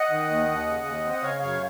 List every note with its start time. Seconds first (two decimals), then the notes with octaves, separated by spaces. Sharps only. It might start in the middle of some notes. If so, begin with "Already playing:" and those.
Already playing: D#5 F#5
0.10 D#3
0.30 D#2
0.48 D#2
0.66 C#3
0.85 D#2
1.04 C4
1.13 F#5
1.22 C#3 C#5 F5
1.42 F#2 C#5 F5